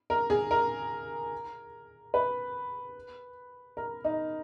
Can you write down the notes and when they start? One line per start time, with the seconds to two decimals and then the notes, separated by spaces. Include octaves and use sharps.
0.10 A#4
0.30 G#4
0.51 A#4
2.14 B4
3.77 A#4
4.04 D#4